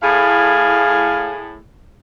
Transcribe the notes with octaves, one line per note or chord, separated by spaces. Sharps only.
A2 G#4 F5